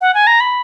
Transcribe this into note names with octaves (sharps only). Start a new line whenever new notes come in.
F#5
G#5
A#5
B5